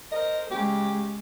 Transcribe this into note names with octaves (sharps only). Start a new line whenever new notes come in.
A#4 C5 D#5
C#3 G#3 G4